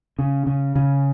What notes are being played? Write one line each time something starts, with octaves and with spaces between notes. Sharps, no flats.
C#3
C#3
C#3